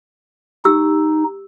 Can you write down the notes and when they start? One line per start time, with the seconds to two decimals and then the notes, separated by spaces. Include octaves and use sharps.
0.65 D#4 G4 E6